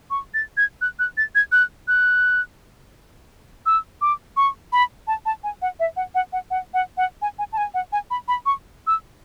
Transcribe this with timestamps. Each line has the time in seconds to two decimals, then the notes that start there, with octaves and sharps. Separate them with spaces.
0.10 C#6
0.34 A6
0.57 G#6
0.81 F#6
0.99 F#6
1.17 A6
1.35 G#6
1.52 F#6
1.88 F#6
3.66 E6
4.01 D6
4.37 C#6
4.72 B5
5.07 A5
5.26 A5
5.44 G#5
5.62 F#5
5.80 E5
5.97 F#5
6.15 F#5
6.33 F#5
6.51 F#5
6.74 F#5
6.97 F#5
7.22 G#5
7.39 G#5
7.53 A5
7.57 G#5
7.74 F#5
7.92 G#5
8.11 B5
8.28 B5
8.46 C#6
8.87 E6